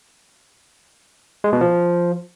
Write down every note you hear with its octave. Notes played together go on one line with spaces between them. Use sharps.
G#3
B2
F3